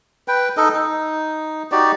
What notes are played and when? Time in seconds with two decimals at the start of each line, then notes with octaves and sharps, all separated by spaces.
0.28 B4 G5
0.57 D#4 A4 D#5
0.74 D#4
1.72 D#4 F#4 G4 D5